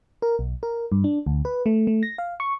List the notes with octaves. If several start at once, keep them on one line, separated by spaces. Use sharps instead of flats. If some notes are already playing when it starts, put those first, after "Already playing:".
A#4
B1
A#4
G2
D4
D2
B4
A3
A3
A#6
F5
C#6